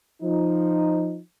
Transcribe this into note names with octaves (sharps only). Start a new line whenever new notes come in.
F3 D#4